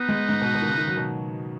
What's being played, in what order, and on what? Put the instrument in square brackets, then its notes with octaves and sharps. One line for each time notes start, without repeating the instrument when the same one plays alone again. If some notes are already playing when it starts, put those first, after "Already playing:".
Already playing: [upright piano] B3 [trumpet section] D#4 B4 D#5 F#5
[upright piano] G#3
G#2
B2
B2
D#3
C#3
D#3
F#3
B2